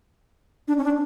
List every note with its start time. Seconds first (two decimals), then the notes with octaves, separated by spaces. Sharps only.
0.68 D4
0.78 C#4
0.84 D4